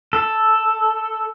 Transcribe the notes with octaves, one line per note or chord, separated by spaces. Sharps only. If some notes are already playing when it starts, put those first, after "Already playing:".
A4